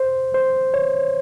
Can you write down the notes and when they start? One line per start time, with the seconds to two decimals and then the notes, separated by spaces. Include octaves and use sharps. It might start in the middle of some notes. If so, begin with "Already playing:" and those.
Already playing: C5
0.34 C5
0.74 C#5